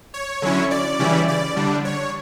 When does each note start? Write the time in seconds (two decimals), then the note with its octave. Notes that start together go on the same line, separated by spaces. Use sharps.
0.14 C#5
0.42 D3 F#3 C#4 E4
0.71 D5
0.99 C#3 E3 G3 C#4 E4
1.28 D5
1.56 D3 G3 D4
1.85 C#5